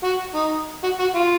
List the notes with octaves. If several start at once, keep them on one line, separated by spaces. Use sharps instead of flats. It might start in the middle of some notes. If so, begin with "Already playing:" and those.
F#4
D#4
F#4
F#4
F4